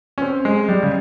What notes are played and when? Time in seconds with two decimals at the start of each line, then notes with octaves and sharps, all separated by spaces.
0.18 C#4
0.22 C4
0.45 G#3
0.69 G3
0.83 C#3